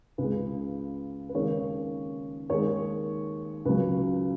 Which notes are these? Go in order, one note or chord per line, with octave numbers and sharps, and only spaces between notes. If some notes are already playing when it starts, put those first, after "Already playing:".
C#2 C#3 G#3 B4
B4
D#2 C#3 G#3 C#5
D#2 D#3 G#3 C#5
C#2 C#3 F#3 B4